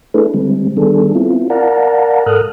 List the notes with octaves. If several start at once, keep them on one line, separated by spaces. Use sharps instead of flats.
A3 D4 E4 G#4 A4 B4
D3 G3 G#3 C4
D#3 G3 B3 D4 G#4 A4
B3 C4 E4 F4
A#4 D5 F5 F#5 A5 A#5
G#2 A4 A#4 D#6 F6 F#6